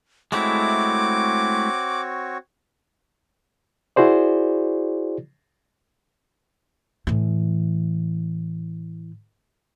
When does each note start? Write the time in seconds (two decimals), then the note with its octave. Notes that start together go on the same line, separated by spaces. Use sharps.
0.32 G#3 A3 C4 E4 F#4 C#5 D6
3.96 E4 F#4 G#4 C5 D5
7.07 A2 E3